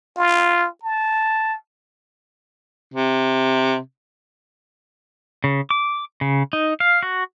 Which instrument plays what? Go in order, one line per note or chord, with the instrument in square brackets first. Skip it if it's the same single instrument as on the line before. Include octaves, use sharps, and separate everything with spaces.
[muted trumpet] F4
A5
[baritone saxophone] C3
[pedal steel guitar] C#3
D6
C#3
D#4
F5
F#4